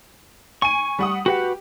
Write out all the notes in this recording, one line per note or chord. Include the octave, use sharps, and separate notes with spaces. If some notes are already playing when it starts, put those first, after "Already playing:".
G#5 C#6 D#7
G3 F#5 D#6
F#4 G4 B4 F#5